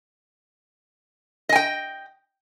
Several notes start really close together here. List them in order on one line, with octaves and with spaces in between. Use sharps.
D#5 G#5 G5